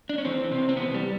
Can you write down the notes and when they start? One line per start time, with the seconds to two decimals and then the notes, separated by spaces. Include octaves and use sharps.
0.09 D4
0.18 C#4
0.25 E3 C4
0.51 C3 C4
0.69 C4
0.77 E3 B3
0.94 G3